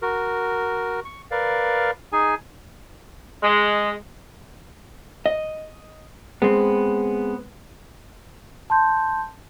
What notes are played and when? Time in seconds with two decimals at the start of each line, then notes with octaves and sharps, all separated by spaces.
0.02 F#4 A#4
1.05 C#6
1.31 A#4 B4 D5 F5
2.13 D#4 G#4 G#5
3.43 G#3
5.26 D#5
6.42 G#3 B3 C4
8.70 A5 C6 G6